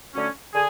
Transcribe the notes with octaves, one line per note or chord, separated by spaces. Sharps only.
D3 F#3 A3 C#4
D3 G#4 G#5